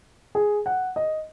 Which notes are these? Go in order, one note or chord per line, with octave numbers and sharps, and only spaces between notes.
G#4
F#5
D#5